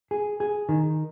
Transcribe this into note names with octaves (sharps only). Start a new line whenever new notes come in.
G#4
G#4
D#3